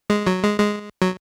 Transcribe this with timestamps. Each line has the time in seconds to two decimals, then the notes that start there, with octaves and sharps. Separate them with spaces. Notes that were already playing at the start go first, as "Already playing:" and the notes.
0.10 G#3
0.27 F#3
0.43 G#3
0.59 G#3
1.02 F#3